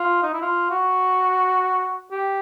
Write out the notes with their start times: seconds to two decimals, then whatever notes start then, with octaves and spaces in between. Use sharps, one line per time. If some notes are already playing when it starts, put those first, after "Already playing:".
Already playing: F4
0.23 D#4
0.33 E4
0.42 F4
0.70 F#4
2.11 G4